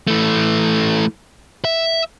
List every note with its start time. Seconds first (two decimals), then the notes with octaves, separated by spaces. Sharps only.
0.08 E3 A3
1.65 E5